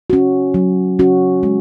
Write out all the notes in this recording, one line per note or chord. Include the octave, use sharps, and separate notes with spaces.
C#4 F#4
F#3
C#4 F#4
G#3